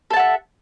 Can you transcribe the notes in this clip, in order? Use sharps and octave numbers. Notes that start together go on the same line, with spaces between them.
A4 E5 F#5 A5